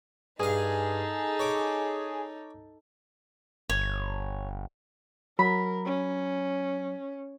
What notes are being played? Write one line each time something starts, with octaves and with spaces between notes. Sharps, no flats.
G2 D#4 G#4 A4 F5
C#5 D6
G1 C#5
F#3 A#4 B5
C#4